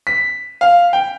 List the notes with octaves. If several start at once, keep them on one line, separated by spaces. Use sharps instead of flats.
B6
F5
G5